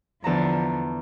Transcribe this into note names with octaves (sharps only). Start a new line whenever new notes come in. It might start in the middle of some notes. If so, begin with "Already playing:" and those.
E2 D3 F3 A5 A#5